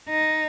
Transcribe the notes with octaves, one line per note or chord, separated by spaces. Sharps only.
D#4